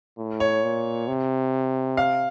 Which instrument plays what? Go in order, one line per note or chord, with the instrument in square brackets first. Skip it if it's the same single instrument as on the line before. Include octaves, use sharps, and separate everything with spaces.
[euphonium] A2
[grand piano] C#5
[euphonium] A#2
C3
[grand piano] F5